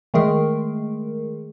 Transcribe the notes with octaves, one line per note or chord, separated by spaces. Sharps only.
D#3 G#3 A3 G#4 A#4